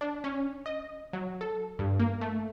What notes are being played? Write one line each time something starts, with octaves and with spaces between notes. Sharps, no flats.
D4
C#4
D#5
F#3
A4
G2
A#3
A3